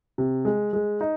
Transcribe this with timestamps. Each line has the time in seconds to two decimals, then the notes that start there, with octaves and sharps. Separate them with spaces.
0.18 C3
0.45 G#3
0.73 G#3
1.01 D#4